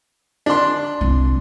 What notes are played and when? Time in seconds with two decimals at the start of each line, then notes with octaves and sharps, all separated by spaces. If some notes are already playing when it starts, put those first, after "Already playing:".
0.46 D4 C6
1.01 C2